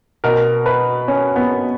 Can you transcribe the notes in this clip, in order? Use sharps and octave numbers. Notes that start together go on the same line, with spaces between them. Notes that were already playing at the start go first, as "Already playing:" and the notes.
B2 A#4
B4
C#4
B3